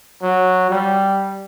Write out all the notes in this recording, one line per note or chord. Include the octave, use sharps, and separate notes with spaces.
F#3
G3